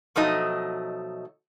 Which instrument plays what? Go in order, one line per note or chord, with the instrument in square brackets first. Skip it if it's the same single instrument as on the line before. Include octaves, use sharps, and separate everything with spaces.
[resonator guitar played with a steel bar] B2 F3 F#3 A3 D#4 D#5